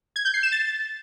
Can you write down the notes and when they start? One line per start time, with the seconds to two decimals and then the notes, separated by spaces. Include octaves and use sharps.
0.16 G#6
0.25 G6
0.34 C7
0.43 E7
0.52 A6